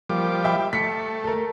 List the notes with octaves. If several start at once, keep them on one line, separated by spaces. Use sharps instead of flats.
F3 G3 A#3 D6
E5 G5 B5
A3 B6 C#7
A4 A#4